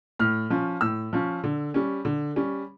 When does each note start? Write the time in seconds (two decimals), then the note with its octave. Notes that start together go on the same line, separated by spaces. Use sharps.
0.19 A2 F6
0.50 F3 C#4
0.81 A2 E6
1.13 F3 C#4
1.44 D3
1.74 G3 C#4
2.05 D3
2.36 G3 C#4